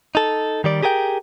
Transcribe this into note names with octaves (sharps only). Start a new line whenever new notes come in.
D#4 A4
D#3 G3 D5
G4 G#4 A#4 D5 G5